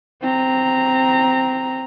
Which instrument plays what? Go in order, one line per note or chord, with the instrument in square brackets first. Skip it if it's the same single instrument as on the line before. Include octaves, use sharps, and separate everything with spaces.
[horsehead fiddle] C4 A#5